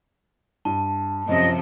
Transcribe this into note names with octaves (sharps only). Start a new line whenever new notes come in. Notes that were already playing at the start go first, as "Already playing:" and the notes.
G2 A5
F#2 C3 F3 D#5